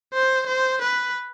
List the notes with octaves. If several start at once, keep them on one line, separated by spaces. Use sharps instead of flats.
C5
C5
B4